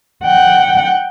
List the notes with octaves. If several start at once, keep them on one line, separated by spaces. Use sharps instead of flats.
F#5 G5